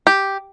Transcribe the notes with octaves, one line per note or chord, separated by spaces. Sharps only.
G4